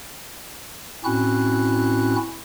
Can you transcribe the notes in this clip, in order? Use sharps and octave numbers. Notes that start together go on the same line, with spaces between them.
A2 C4 C#4 E4 F#4 F#6